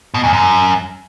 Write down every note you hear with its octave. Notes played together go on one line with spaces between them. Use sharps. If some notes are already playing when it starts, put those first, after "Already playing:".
B2
E2
F#2